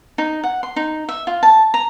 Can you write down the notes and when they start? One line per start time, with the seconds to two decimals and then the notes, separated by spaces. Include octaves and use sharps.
0.18 D#4
0.44 F#5
0.63 C6
0.76 D#4
1.09 E5
1.27 F4
1.43 A5
1.74 A#5